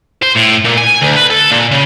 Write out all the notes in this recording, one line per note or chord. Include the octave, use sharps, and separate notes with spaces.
C5
A2
A#2
G#5
D2
B4
A4
A#2
C#3